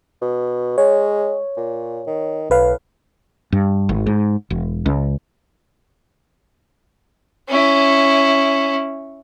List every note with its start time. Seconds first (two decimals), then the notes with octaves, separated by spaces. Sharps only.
0.21 B2
0.78 G#3 C#5
1.57 A#2
2.07 D#3
2.50 B1 A2 B4 F5
3.52 G2
3.89 G#1
4.07 G#2
4.50 E1
4.86 C#2
7.48 C#4 E4